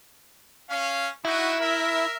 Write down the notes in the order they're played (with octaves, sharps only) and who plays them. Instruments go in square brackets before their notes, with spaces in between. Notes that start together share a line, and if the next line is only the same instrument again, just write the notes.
[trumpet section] C#4 F5
[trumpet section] D#4 F#4 [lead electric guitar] E4
[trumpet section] A#4 E5